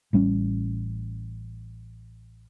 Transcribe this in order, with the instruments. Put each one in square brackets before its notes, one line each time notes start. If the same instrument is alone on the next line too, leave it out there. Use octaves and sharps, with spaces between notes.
[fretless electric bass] A1 G3 C4 C#4